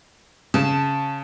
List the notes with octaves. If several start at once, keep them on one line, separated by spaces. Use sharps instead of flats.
C#3 A5